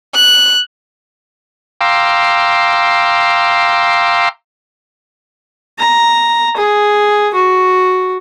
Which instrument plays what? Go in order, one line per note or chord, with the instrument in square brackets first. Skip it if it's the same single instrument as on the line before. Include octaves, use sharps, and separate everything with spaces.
[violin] F#6
[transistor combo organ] F5 G5 A#5 C6 D6 E6
[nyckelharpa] A#5
G#4
F#4